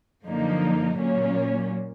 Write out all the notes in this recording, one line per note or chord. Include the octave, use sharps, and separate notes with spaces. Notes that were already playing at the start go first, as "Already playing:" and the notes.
F#2 D3 F3 A#3 D#4
A#2 F#3 A#3 C#4